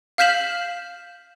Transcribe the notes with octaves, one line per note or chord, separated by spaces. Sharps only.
F5 F6 G6 B6 E7 F#7